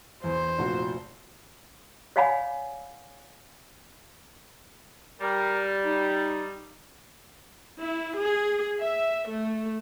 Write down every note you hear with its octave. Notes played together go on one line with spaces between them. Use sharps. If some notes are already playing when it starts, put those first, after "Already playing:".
E2 C5
F1 A#2 F#4
C#5 D5 F5 F#5 G#5 B5
G3 A#4
D#4
E4
G#4
E5
A3